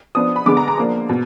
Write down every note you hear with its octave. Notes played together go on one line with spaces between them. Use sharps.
F3 B3 D4 D#6
B5
D3 G#3 B3 D6
A#5
A#5
F3 A#3 D4
B2